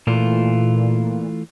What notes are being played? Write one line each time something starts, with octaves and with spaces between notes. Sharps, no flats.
A#2 E3 A3 F4